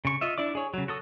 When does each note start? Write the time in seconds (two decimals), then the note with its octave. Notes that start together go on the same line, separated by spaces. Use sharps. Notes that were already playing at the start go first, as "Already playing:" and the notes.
0.05 C#3 C#6
0.21 F4 D#5 E5
0.38 D4 E4 D5 D6
0.55 G#4 C#5
0.74 C#3 F#3
0.88 F#4 A4 D#6